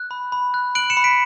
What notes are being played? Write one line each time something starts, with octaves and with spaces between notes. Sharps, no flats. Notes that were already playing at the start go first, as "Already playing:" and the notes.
Already playing: F#6
B5
B5
F#6
F#6 D7 F#7
C#7 E7
B5
B6 D7